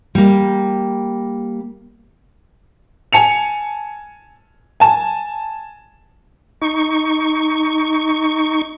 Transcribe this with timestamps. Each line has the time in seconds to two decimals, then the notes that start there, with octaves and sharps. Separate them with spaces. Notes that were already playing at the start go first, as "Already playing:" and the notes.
0.15 G3 A#3
3.13 G#5 A5 C#7 F7
4.80 G#5 A5
6.62 D#4 C#6